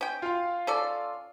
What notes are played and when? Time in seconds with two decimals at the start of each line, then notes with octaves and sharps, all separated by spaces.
0.01 C#4 G5
0.22 F4 F5
0.67 C#4 A4 D5